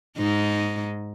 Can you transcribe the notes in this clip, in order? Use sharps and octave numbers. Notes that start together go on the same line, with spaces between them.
G#2 D#4